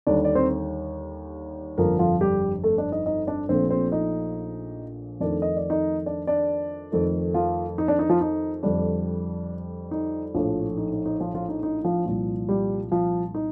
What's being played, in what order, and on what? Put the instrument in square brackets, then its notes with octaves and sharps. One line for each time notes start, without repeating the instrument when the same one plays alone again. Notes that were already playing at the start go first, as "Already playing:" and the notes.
[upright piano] D#2 D3 G3 D4 D5
D5
C4 C5
G1 F2 D3 F3 A#3 A#4
F3 F4
G3 G4
A3 A4
D4 D5
D#4 D#5
D#4 D#5
D4 D5
A#1 A#2 F3 A3 C4 C5
C4 C5
D#4 D#5
F2 D#3 A3 D4 D5
D#5
D5
D#4 D#5
D4 D5
D4 D5
F2 D#3 A3
F3 F4
D#4
D4
D#4
F3 F4
D#4
F2 D3 G3 D4
D#4
A#1 A2 F3 A3 F4
D#4
D#4
D#4
F3 F4
F3 F4
D#4
D#4
F3 F4
C2 A#2 F3
G3 G4
F3 F4
D#4